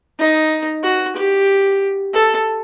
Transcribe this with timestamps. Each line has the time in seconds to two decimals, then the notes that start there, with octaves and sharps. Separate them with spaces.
0.19 D#4
0.84 F#4
1.16 G4
2.13 A4